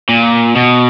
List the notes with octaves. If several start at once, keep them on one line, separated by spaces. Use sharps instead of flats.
A#2
B2